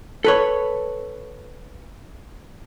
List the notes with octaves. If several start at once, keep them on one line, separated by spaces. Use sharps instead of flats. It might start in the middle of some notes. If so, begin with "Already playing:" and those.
A4 B4 C#5